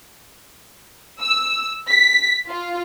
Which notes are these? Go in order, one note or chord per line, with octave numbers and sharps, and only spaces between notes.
E6
B6
F4